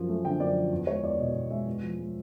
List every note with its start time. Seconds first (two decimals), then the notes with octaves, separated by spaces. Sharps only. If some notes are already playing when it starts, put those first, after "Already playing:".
Already playing: F#2 F3
0.09 A3
0.25 D3 G5
0.40 F#2 D5
0.56 F3
0.72 E2
0.87 G#3 C#5
1.04 E2 D5
1.19 B2 D#5
1.34 E2 D#5
1.51 G#3 E5
1.67 E2
1.83 F3
1.99 G#3